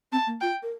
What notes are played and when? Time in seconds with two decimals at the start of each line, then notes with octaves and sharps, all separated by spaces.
0.12 C4 A5
0.27 A#3
0.41 F4 G5
0.63 A#4